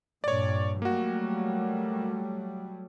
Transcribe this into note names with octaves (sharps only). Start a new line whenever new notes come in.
G2 A#2 C#5 D5
F#3 G3 A3 A#3 F#4